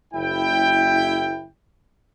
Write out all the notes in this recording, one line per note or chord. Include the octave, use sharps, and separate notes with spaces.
F#1 E4 G5